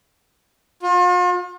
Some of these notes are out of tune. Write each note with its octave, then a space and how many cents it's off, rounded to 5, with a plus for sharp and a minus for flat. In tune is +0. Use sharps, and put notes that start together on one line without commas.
F4 +40